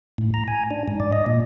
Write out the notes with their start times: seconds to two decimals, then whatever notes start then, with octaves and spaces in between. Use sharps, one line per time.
0.18 A2
0.34 A#5
0.48 G#5
0.71 D4
0.88 G#2
1.00 D5
1.13 D#5
1.26 A#2